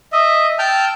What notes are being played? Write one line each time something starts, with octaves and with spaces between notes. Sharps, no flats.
D#5 E5
G5 A5 E6 F6 G6